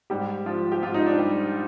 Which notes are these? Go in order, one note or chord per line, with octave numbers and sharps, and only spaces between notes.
G#2 G3 G4
F3 G3 F4
G4
G#2 F4
D#4
D4
G3